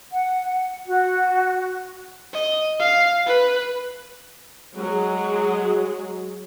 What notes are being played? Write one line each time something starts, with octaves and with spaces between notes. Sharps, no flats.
F#5
F#4
D#5
F5
B4
F#3 G#3 G#4